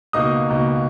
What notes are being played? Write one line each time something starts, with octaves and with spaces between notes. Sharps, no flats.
C#2 B2 A#3 D#4 D#5 D#6
C#2 B2 A#3 D#4